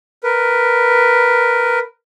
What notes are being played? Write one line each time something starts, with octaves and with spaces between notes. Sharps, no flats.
A#4 B4